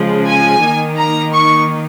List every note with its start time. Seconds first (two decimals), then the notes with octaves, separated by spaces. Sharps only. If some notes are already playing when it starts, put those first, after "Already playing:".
Already playing: C#3 F3 G#3
0.26 G#5
0.62 D#3 A#3 D#4
0.98 A#5
1.33 C#6